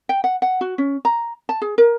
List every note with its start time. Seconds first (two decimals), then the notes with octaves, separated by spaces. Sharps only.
0.09 G5
0.24 F#5
0.42 F#5
0.61 F#4
0.78 C#4
1.05 A#5
1.49 A5
1.62 G#4
1.78 A#4